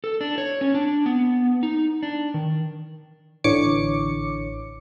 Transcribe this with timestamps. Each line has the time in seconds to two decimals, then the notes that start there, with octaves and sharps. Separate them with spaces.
0.04 A4
0.21 D4
0.38 C#5
0.61 C#4
0.74 D4
1.06 B3
1.63 D#4
2.03 D4
2.34 D#3
3.44 A1 D3 E3 C#5 D6 C#7